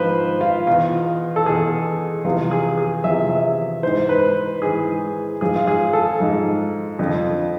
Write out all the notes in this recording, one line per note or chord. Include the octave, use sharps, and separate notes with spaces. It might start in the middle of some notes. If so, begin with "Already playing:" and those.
Already playing: G#2 F3 B4 C5
F4
E2 B2 F4
A4
E2 B2 G#4
E2 C3 F3 F4
G#4
G#4
E2 C3 F3 E5
E5
G#2 E3 C5
B4
G#2 E3 G#4
G#2 F3 G#4
F4
G#4
A4
G#2 F3
F2 D3 F3